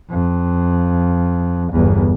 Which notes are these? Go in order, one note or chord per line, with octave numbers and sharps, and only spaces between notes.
F2
G1 E2